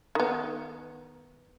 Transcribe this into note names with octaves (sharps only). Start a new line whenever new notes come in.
D#3 B3